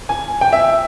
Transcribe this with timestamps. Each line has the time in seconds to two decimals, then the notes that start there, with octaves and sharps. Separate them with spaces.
0.09 G#5
0.41 G5
0.53 E5